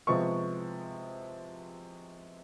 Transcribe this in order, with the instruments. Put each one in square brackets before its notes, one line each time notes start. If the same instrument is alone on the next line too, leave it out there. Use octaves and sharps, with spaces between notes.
[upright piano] C3 F3 G#3 B3 C#6